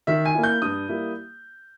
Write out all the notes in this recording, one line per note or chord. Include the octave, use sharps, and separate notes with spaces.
D#3 E5
G#5
A#3 E4
G6
G2 D#6
G3 A#3 E4